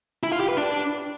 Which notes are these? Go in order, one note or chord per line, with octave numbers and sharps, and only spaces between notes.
E4
F4
G4
B4
D4